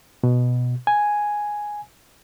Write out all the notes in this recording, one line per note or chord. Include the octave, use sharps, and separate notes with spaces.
B2
G#5